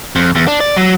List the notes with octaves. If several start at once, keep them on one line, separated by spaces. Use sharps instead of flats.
F2
E2
D4
D5
F#3